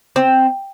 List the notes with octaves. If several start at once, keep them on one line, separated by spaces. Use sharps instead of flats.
C4